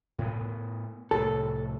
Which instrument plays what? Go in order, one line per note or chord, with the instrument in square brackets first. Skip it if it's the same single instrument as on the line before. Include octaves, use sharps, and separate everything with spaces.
[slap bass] A2 B3
[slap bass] C2 A2 [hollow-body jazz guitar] A4